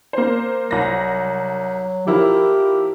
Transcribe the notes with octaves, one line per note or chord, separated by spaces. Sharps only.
A#3 C5
C2 F#3 A#6
F3 E4 G4 A#4